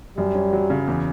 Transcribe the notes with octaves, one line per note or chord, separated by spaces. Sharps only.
F#2 G3
C#4
F#3
C#3
E2